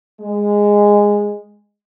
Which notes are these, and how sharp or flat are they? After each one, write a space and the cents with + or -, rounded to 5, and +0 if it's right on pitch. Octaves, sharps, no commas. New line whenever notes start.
G#3 -10